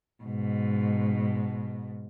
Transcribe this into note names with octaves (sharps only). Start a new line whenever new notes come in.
G#2 B2